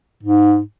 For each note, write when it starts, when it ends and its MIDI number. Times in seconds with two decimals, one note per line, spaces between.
0.23 0.59 44